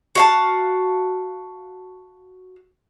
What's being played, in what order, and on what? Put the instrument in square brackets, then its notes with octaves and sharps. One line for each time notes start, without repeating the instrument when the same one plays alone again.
[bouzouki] F#4 F5 A5